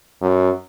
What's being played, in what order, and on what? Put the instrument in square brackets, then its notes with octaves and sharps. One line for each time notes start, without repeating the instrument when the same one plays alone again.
[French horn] F#2